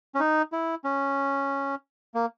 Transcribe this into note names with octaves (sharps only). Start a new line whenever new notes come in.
C#4
D#4
E4
C#4
A#3